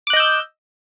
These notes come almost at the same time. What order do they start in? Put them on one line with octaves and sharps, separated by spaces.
D6 F#6 D#5 G6 E6